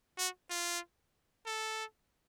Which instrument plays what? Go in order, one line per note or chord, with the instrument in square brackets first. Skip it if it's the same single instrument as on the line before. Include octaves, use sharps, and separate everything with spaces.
[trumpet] F#4
F4
A4